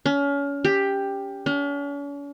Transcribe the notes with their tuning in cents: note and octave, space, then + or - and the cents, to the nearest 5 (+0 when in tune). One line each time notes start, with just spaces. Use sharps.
C#4 +30
G4 +10
C#4 +45